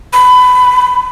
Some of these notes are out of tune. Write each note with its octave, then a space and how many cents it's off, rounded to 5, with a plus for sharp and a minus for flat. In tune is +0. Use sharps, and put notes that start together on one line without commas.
B5 +25